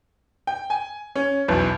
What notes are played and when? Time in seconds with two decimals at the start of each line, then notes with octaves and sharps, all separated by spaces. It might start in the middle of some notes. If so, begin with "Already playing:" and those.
0.47 G5
0.70 G#5
1.15 C#4
1.48 B1 E2